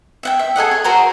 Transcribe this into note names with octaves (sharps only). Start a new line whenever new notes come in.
E5 F#5 G5
E5
G#4 A4 D#5 F#5
C#5
F#4 G#4 A#4 C5